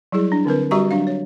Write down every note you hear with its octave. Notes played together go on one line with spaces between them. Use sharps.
F#3 G3 E4 G#4
D4
D3 C4 A#4 B4
G3 F#4 G4 E5 A#5 C#6
F#3 D4 F5
C#5